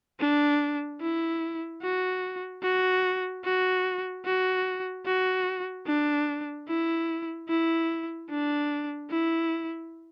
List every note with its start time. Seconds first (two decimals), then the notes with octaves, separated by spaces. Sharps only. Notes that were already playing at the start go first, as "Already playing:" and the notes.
0.20 D4
1.01 E4
1.82 F#4
2.62 F#4
3.44 F#4
4.25 F#4
5.06 F#4
5.87 D4
6.68 E4
7.48 E4
8.30 D4
9.10 E4